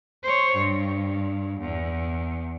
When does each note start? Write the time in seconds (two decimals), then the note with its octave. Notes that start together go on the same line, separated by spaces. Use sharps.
0.23 C5 C#5
0.56 G2
1.61 E2